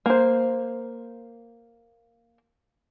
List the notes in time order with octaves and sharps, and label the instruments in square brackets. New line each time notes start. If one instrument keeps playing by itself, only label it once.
[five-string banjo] A#3 C5